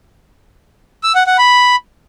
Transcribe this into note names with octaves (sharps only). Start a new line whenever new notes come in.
E6
F#5
F#5
B5